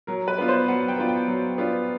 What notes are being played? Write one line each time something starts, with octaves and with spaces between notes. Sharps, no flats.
F#3 A#4
B4
B3 D4 F4
C5
F#3 F#5
G5
B3 D4 F4
G5
F#3
B3 D4 F4